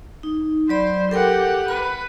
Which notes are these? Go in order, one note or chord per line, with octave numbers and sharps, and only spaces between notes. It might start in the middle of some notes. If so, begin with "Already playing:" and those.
D#4
F#3 C5 D5 B5
G4 A4 A#4 F#5 G5
B4 B5